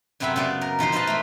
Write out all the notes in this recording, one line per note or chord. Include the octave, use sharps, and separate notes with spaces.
F#2 C3 B3 C4 E5 B5
C#3 B3 D5
A#4
B2 F3 D#4 C5
D#4 B4 C5 D#5 F5 A5
A3 A#3